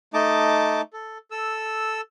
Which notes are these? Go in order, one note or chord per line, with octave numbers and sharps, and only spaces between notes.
A3 D#4 D#5 A5 D6
A4
A4 E6